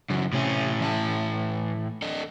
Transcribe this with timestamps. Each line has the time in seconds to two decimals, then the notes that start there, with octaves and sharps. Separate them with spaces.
0.10 F#2 C#3 E3
0.33 A2 C3 C#4
0.80 E3 D#5 A5
2.02 D4 A4 D#5